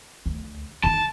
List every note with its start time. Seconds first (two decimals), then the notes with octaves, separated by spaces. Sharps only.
0.26 D2
0.84 D3 D#4 A5